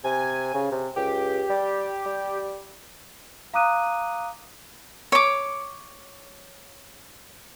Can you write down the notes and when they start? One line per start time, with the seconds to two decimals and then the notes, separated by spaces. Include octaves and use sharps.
0.04 C3 G#5
0.55 C#3
0.72 C3
0.96 C#2 G4
1.50 G3
2.06 G3
3.54 F5 A#5 D6 D#6 F#6 D#7
5.12 C#5 D6